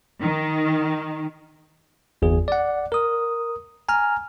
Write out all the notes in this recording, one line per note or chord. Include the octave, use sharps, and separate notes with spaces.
D#3
G1 E2 G#4
D5 F#5
A#4 D#6
G#5 A#5 F6